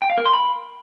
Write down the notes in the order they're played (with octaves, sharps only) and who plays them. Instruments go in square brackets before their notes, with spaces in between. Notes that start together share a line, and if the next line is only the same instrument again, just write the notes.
[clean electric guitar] G5
F5
A#4
C6
B5